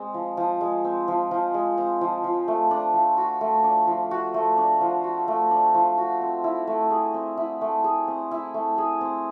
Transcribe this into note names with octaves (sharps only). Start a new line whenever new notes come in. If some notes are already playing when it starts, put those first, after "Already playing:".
Already playing: G#3 C4
F3
F3
G#3
C4
F3
F3
G#3
C4
F3
F3
A3
D4
F3
F#4
A3
D4
F3
F#4
A3
D4
F3
F#4
A3
D4
F3
F#4
C4
E4
A3
G#4
C4
E4
A3
G#4
C4
E4
A3
G#4
C4